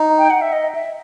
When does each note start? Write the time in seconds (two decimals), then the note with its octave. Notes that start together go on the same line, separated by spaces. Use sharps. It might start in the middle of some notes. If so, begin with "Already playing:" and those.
Already playing: D#4
0.18 G5
0.30 F#5
0.41 E5
0.53 D#5
0.75 E5